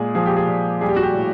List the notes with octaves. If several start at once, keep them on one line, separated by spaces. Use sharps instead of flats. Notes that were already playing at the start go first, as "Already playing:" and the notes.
Already playing: A#2 G#3 G#4
F3 G#4
G4
G#4
A#2
G3 G#4
G4
F#4
G4
A2